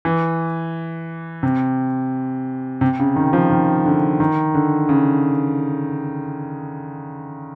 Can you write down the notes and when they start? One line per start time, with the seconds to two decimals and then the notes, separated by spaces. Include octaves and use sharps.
0.05 E3
1.43 C3
2.81 C3
3.00 C#3
3.16 D#3
3.33 F3
3.50 D#3
3.85 D3
4.20 D#3
4.54 D3
4.89 C#3